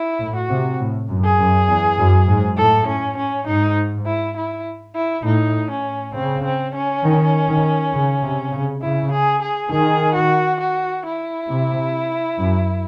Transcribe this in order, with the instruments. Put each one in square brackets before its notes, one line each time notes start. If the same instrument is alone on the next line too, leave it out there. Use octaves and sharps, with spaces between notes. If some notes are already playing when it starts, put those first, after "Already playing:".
Already playing: [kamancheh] E4
[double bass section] A2
[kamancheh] F#4
[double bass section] C3
A2
F#2
[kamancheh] G#4
[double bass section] F#2
E2
F#2
G#2
[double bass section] A2 [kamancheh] A4
[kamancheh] C#4
C#4
[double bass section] G#2 [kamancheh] D#4
[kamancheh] E4
E4
E4
[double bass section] A2 [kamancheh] D#4
[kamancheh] C#4
[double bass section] C#3 [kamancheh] C4
[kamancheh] C4
C#4
[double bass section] D#3
D#3
C#3
C3
C#3
[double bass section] C#3 [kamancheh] E4
[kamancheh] G#4
G#4
[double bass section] D#3 [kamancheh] G#4
[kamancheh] F#4
F#4
E4
[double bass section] C3
F#2